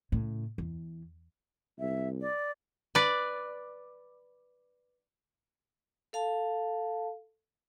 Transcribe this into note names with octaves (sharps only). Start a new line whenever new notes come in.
A2 C#3
E2
C2 E5
D5
B4 D5
A4 F5 A5